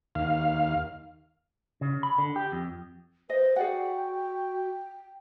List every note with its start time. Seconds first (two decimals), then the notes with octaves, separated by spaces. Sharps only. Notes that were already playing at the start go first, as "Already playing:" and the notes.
0.15 D#2 F5
1.81 C#3
2.03 B5
2.18 D3
2.36 G4
2.52 F2
3.30 B4 C5 D#5
3.56 F#4 G#4 D5 F#5 G5